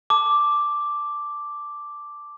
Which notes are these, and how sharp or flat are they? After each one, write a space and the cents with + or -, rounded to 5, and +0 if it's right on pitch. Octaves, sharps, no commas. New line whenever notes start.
A5 +0 D6 +0